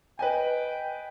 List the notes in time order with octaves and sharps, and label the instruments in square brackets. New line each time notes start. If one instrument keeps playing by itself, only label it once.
[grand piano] B4 D#5 G#5 [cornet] G5